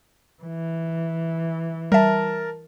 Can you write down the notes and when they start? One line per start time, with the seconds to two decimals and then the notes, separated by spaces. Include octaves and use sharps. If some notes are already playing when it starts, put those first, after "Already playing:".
0.43 E3
1.92 G3 A#4 E5 A5